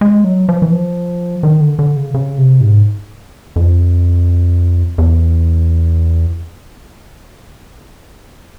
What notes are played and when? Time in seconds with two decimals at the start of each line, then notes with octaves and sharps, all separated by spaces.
0.01 G#3
0.24 F#3
0.49 F3
0.62 E3
0.72 F3
1.43 D#3
1.61 D3
1.79 D3
1.96 C#3
2.14 C#3
2.38 C3
2.61 G#2
3.56 F2
4.98 E2